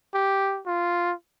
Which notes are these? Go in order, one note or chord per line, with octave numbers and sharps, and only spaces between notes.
G4
F4